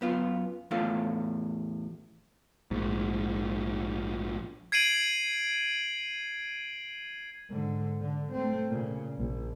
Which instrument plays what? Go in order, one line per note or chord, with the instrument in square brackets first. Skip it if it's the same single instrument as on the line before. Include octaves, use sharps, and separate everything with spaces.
[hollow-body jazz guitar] F#2 B3 F4
E2 A2 D4 F4 A4 F5
[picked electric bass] A#1 G#2
[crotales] G#6 C7 D7 D#7 F#7
[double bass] G#2 D3
D3
A3 C4
A#2 C#3
A#1